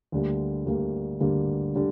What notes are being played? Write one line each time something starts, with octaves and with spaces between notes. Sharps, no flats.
D2 D3 G3 A#3
D2 D3 G3 A#3
D2 D3 G3 A#3
D3 G3